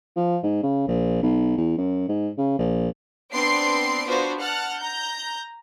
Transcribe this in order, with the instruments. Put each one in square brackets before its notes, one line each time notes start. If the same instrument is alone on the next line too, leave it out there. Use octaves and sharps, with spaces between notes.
[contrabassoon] F3
G#2
C#3
A#1
B1
E2
F#2
G#2
C#3
A#1
[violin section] B3 C4 D4 C6 C7 D7
B3 D4 F4 F#4 C5
F#5 A5 F6 F#6
A#5 G6